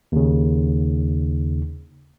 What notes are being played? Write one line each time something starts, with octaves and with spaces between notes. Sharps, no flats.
D#2 C#3